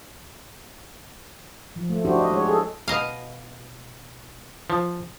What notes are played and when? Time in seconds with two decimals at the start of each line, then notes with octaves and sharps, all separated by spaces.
1.76 F3
1.89 A3
2.05 D4 E4 F#4 G4 C5
2.19 D#5
2.30 G#3 C#5
2.45 G#4 A4
2.88 B2 D#5 F5
4.70 F3